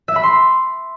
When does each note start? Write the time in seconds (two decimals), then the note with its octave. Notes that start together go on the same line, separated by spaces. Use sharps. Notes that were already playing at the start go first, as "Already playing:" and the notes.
0.08 E5
0.16 B5
0.23 C6